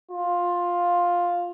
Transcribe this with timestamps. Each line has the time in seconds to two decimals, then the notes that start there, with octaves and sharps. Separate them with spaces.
0.11 F4